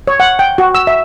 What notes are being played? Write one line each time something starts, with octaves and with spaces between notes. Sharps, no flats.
C#5
F#5
G5
F#4
E6
E5